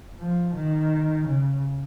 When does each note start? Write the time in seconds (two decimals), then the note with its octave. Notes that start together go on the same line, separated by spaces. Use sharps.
0.20 F3
0.55 D#3
1.27 C#3